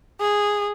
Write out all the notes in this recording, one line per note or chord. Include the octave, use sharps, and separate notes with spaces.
G#4